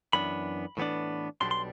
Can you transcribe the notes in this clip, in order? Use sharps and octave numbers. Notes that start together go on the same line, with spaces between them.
F#2 E3 B3 D4 B5
A2 E3 B3 D4
B1 B2 G3 D4 C6
C6